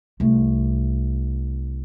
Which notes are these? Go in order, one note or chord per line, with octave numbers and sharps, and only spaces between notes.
C2 A3